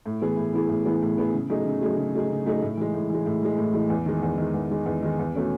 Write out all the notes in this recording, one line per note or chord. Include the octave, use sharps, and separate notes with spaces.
A2
E3 B3 E4 G#4
A2
E3 B3 E4 G#4
A2
E3 B3 E4 G#4
A2
E3 B3 E4 G#4
C#3
F#3 A3 D#4 G#4
C#3
F#3 A3 D#4 G#4
C#3
F#3 A3 D#4 G#4
C#3
F#3 A3 D#4 G#4
A2
E3 G#3
A2
E3 G#3
A2
E3 G#3
A2
E3 G#3
E2
D#3 G#3
E2
D#3 G#3
E2
D#3 G#3
E2
D#3 G#3
E2
B2 A3 C#4